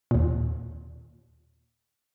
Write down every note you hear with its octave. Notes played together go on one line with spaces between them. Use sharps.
D#2 A#2